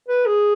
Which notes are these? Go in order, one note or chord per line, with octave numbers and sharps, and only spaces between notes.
B4
G#4